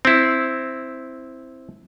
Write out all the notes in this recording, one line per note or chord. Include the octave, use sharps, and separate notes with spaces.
C4 E4